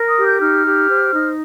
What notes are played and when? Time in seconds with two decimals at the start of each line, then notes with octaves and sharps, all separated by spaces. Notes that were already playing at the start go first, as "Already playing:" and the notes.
Already playing: A#4
0.09 D#6
0.17 G4
0.25 G6
0.40 D#4 F6
0.65 G4
0.90 C5
1.13 D#4